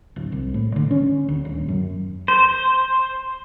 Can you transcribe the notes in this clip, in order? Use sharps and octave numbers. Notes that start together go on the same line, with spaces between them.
D1
C2
A2
D3
C#4
D2
D#1
F#2
C5